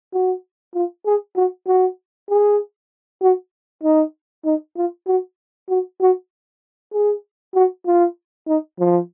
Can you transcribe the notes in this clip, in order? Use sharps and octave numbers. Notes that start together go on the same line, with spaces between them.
F#4
F4
G#4
F#4
F#4
G#4
F#4
D#4
D#4
F4
F#4
F#4
F#4
G#4
F#4
F4
D#4
F3